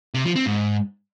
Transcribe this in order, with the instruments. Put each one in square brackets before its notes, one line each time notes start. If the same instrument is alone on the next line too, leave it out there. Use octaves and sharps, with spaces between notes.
[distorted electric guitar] C3
F3
C4
G#2